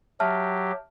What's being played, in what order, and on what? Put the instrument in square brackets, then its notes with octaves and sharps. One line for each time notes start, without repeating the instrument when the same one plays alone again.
[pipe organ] F#3 G4 [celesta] E5 A5 F6